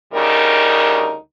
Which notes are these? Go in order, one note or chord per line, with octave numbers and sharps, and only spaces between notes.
D2 C#3 G3 D#4 A#4